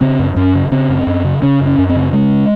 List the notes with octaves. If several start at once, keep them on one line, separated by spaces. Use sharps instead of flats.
C#3 C4
F#2
F#2 C#4
C#3
C#3 C4
F#2
F#2
C#3
C#3 C#4
F#2
C#4
F#2
C4
C#3
C#3 G#3